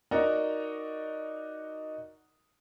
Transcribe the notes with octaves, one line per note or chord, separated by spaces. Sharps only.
D#4 F#4 A#4 D5 F#5 A#5